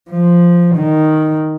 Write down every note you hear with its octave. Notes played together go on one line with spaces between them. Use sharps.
F3
D#3